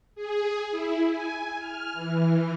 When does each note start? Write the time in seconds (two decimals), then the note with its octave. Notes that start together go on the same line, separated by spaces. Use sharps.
0.15 G#4
0.71 E4
1.09 G#5
1.59 F6
1.93 E3